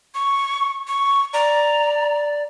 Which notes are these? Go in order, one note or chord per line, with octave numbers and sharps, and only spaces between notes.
C#6
C#6
D5 A#5